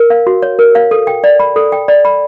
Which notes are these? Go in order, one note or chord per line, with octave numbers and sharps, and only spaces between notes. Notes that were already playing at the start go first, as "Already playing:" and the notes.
Already playing: A#4
F5
F#4
C#5
A#4
F5
A4
G5
D5
B5
A4
G5
D5
B5